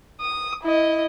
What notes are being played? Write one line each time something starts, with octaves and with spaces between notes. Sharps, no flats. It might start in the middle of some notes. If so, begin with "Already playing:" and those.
D#6
E4 D#5